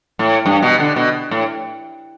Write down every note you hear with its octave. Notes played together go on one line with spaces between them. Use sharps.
A2
G2
B2
D3
B2
A2